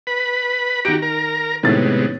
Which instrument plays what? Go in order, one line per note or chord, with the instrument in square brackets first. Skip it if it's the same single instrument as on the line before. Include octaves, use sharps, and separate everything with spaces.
[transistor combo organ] B4 B5
[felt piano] D#3 D7 [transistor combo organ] F#4 G4 A#5
[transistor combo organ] A#4 A#5
[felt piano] A2 D#3 A6 [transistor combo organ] C3 G#3 B3